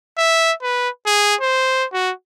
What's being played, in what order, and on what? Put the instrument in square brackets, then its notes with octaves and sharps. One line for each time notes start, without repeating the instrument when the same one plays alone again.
[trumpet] E5
B4
G#4
C5
F#4